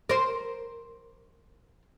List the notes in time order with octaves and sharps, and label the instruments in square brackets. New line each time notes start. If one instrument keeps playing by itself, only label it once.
[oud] A#4 C5